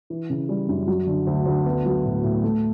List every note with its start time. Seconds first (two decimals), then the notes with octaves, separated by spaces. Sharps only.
0.10 E3
0.30 C#3
0.49 G3
0.69 F#2
0.88 F#3
1.07 D3
1.27 D2
1.46 D2
1.66 B3
1.86 F#3
2.05 A2
2.24 A2
2.44 A3